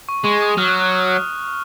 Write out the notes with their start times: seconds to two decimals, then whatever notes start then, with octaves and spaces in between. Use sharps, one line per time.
0.09 C#6
0.25 G#3 C#6
0.42 D#6
0.58 F#3 F6
0.69 F#6